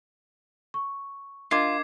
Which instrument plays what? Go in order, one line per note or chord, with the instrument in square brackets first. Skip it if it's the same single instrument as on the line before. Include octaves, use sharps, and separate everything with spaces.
[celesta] C#6
[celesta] D4 A#4 D#5 [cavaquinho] F4 [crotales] D6 G#6 C7